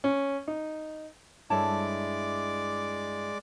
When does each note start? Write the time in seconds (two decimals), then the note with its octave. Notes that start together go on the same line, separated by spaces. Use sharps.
0.04 C#4
0.48 D#4
1.50 G2 G#3 E4 A4 C#5 D5 A5 D6